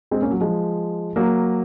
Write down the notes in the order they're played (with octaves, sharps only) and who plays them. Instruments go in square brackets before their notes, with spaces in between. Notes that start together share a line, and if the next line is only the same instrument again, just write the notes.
[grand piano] G#3 C4
A#3 C#4
F#3
F3 G#3
F#3 A#3